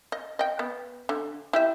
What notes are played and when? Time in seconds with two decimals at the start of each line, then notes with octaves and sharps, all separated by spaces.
0.12 D#5
0.39 D#5 G5
0.59 B3
1.09 D3
1.53 E4 G4 E5